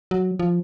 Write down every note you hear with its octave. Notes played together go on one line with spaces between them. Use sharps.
F#3
F3